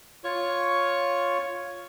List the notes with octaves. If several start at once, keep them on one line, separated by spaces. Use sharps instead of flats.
F4 C#5 C#6